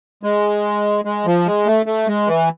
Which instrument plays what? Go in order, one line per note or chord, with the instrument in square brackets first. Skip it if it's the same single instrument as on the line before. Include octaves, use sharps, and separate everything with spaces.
[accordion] G#3
G#3
F3
G#3
A3
A3
G#3
E3